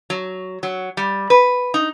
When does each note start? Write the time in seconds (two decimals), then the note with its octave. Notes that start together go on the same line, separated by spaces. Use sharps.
0.10 F#3
0.63 F#3
0.97 G3
1.30 B4
1.74 D#4